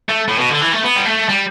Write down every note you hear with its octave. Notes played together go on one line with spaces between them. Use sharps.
A3
A2
B2
D3
E3
A3
B3
G3
A3
G3